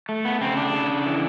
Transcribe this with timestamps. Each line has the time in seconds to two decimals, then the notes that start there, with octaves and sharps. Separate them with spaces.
0.09 A3
0.25 B3
0.41 C#3 C4
0.57 D4
0.73 C#3
1.05 E3